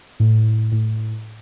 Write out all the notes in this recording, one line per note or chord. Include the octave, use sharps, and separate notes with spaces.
A2
A2